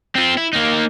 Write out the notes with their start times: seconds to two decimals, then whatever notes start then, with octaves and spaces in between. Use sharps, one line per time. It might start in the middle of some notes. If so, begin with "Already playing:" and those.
0.15 C4 F4
0.37 E4
0.53 A#3 D#4